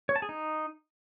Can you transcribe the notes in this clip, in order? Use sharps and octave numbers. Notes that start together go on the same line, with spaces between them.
C#5
A5
G#4
D#4